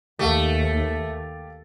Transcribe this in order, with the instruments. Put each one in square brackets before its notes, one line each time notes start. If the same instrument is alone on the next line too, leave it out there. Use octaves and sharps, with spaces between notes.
[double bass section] D#2 [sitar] A3 [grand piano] G4 F5